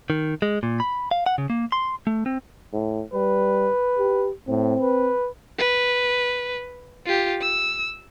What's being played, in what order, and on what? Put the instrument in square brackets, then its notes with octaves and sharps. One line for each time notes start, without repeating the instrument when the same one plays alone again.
[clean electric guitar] D#3
G#3
A#2
B5
F5
F#5
C#3
A#3
C6
A3
C4
[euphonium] A2
[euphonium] G3 [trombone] B4
[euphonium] G4
[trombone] A2 [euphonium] C4
[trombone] B4
[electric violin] B4
F4 G4
E6